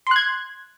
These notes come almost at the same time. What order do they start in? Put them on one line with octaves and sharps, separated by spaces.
C6 F#6 G#6